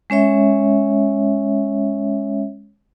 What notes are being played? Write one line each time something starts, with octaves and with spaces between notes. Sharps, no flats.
G#3 C#4 C#5 E5